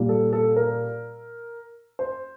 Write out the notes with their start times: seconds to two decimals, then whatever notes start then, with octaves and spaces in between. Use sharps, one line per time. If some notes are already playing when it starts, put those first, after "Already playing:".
Already playing: A#2 G3
0.09 A4
0.33 A4
0.56 A#4
1.99 C5